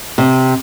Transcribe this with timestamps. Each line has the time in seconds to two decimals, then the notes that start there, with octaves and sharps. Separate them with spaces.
0.18 C3